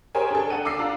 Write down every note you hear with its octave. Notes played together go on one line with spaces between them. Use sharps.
G4 G#4 A#4 C5 C#5 G#5
D4 A4
D4 A4 F#5 D#7
D6 E6 C7
D4 F4 A#5